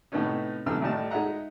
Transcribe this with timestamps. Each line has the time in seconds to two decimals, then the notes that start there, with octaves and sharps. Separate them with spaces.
0.12 A2 C3 A3 B3 C#4 D#4
0.66 F#2 C3 A3 B4 E6 F6
0.82 A1 A2 G3 D#5 A5
1.11 G#3 D#4 D#5 E5 F#5 A#5